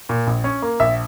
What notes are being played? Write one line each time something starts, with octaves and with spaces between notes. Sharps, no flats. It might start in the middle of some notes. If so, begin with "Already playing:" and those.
A#2
A#1
C#4
A#3
A#1 E5